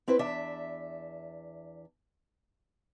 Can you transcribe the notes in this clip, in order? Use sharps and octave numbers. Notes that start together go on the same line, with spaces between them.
C4 E4 B4 C5
E2 D4 E5